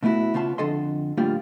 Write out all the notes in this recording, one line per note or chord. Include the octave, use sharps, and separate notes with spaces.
B2 A3 B3 E4 F#4
C#3 B3 F4 A5
F2 D3 A4 D#5 C6
A2 D3 G3 A#3 F4